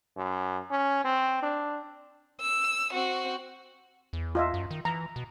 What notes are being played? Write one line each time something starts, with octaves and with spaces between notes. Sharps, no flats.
F#2
C#4
C4
D4
E6
C4 F#4
E2
F4 D#5 E5
F#2
D#3
E3 A#5
B2